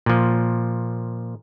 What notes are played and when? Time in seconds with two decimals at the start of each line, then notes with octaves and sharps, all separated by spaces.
0.06 A#2 F3